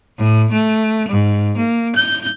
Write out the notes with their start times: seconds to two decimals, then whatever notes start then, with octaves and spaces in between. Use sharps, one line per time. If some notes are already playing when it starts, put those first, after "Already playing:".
0.17 A2
0.51 A3
1.08 G#2
1.57 A#3
1.94 G6